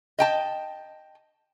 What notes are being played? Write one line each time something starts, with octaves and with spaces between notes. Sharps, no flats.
D#5 G5 A5